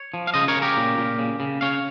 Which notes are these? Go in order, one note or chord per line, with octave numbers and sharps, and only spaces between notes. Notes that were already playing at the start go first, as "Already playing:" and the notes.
Already playing: C#5
F3
F5
C#3 C5 D#5
A#4 C#5
C#3
G4 A#4
A#2
A#2
C#3
C#3
C#3 C#5 F5